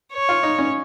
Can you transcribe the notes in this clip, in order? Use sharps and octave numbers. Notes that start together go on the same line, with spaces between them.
C#5
F4
D#4
C#4